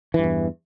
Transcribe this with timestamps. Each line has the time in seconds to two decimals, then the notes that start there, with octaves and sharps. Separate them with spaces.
0.14 E3
0.19 G2
0.24 E2